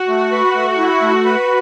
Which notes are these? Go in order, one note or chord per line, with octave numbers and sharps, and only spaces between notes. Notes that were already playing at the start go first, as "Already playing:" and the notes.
Already playing: F#4
A3
B4
A3
E4
A3
B4